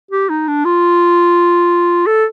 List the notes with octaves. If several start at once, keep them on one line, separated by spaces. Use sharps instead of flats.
G4
D#4
D4
F4
A4